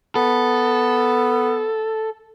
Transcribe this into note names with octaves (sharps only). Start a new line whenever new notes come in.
B3 A4